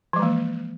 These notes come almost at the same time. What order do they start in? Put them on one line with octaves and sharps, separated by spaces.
F3 G#3 E3 A#3